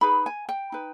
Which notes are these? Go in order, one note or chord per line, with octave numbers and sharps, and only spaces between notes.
D#4 G#4 B4 B5
G#5
G5
D#4 B4